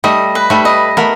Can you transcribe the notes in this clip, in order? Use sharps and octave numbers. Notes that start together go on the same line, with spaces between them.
G3 A3 D#5
B4
G3 A3
D#5
A3 B3 A#4